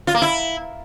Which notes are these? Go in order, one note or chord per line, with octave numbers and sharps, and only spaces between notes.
F4
A#3
E4